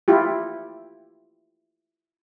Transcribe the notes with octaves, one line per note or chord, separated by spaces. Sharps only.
E4 F4 G4